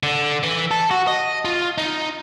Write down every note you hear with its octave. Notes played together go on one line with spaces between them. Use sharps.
D3
E3
A4
F#4
D#5
F4
D#4